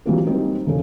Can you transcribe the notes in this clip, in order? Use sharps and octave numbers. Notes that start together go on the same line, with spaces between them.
E3 F#3 G3 A#3 C4 F4
G3 C4 D#4 G4
E1 C#3 A4